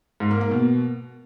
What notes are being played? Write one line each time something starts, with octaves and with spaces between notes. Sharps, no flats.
G#2
A#3
A#3
B2